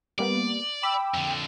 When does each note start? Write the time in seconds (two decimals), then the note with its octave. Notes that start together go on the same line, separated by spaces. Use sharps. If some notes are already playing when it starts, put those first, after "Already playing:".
0.19 G3 A#3 B3 D5
0.83 G5 B5 D6 E6
1.14 F2 D3